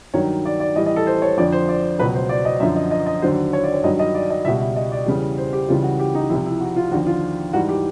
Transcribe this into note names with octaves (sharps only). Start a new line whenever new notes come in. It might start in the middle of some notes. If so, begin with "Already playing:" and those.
G2 D#3 F#3 C#5
D5
D5
A2 E3 G3 D#5
D#5
A4
C5
C#5
F2 D3 F3 D5
C5
D5
C#2 B2 F#3 B4
C5
D5
D#5
F#2 D3 F3 E5
D#5
D#5
D#5
D#2 D3 F#3 C5
C#5
D5
C#5
G2 D#3 F#3 D#5
D#5
D5
D#5
C#2 B2 G3 E5
E5
D#5
D5
E2 C#3 E3 G3
C5
G4
C#2 C#3 E3 G3 F4
F#4
G4
D#4
C2 C3 F3 E4
E4
F#4
F4
D#2 D3 F3 F#4
F4
G#2 E3 G3 F#4
G4